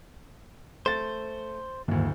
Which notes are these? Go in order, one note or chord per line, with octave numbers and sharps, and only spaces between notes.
A3 C5 A6
D1 D2 G2 D#3 A#3